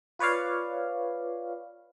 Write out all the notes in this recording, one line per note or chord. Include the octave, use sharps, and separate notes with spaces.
F4 B4 C#5 D5 F5